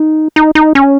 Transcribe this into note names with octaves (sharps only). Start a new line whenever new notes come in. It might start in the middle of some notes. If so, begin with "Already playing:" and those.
Already playing: D#4
D#4
D#4
C#4